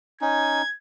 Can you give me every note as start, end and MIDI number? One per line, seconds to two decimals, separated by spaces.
0.21 0.62 61
0.21 0.62 63
0.21 0.72 92